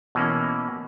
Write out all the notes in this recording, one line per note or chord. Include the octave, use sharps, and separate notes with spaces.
B2 E3 A#3 C#4